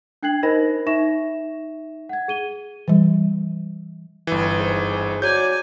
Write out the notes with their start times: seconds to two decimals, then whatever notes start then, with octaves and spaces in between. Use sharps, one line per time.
0.23 D4 G5 F#6 G#6 C7 F#7
0.43 D#4 A#4 C5 D#5 B5 A#6
0.86 D#4 E5 C#6 A#6 E7
2.09 F#5 G#6
2.28 G#4 D#7 G7
2.88 E3 G3
4.27 G1 E3
4.59 G#2
5.22 F#3 D5 G#5 G6